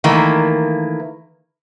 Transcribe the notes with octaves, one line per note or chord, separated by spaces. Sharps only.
D#3 E3 A3 A#3